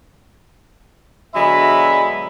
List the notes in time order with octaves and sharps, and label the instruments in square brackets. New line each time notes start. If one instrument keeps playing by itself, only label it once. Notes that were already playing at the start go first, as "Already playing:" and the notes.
[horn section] B2 D3 F#3 G#3 E5 B5